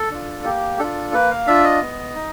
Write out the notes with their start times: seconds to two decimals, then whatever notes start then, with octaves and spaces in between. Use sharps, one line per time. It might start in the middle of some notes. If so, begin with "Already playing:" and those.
Already playing: A4
0.11 D4 F4
0.44 A#3 G4
0.79 D4 F4 A4
1.13 A#3 B4
1.31 F5
1.47 D4 F4 E5
1.64 D#5
1.81 B3
2.15 D#4